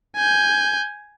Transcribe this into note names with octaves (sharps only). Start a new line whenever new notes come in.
G#5 G6